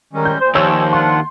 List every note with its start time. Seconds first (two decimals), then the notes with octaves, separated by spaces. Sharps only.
0.13 D#3 G3 G#3 C#4
0.25 G6
0.41 A#2 C5
0.55 D#2 F3 C#5 E6 G6
0.93 D4 F4 F#5 C6